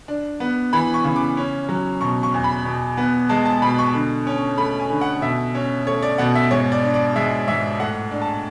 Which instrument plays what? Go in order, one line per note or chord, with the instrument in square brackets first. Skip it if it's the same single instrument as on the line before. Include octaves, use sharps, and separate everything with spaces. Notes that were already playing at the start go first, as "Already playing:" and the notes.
[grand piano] D4
B3
E3 B5
C#6
C#3
D6
C#4
F#3
B2 C#6
C#6
E2
B5
B2
B3
G#3 A5
A5
B2 B5
C#6
D3
C#4
A3 B5
G#5
D3
F#5
B2 E5
C#4
A3 C#5
D5
B2 F#5
E5
G#2 C#5
D5
D4
D5
G#3 E5
G#2 E5
A2 F#5
D4
A5